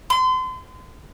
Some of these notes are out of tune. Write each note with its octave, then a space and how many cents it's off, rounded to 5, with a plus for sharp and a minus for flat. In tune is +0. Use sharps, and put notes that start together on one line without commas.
C6 -35